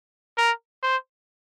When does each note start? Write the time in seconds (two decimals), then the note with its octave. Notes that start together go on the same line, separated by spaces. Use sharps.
0.38 A#4
0.83 C5